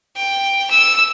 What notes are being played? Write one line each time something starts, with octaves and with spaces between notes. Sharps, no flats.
G5
E6